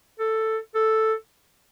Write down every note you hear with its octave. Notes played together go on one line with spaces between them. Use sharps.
A4
A4